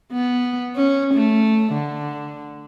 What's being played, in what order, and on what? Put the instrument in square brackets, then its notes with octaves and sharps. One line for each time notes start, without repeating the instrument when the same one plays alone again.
[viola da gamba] B3
C#4
A3
D3